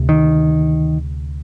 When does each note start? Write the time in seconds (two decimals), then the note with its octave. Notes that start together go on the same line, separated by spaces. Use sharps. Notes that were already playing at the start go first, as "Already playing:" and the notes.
Already playing: D2 C3
0.09 D#3